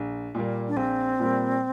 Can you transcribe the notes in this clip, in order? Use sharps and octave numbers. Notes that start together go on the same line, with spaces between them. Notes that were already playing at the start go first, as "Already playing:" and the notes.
Already playing: A#1
A#2 G3 A#3
D4
A#1 C4
A#2 G3 A#3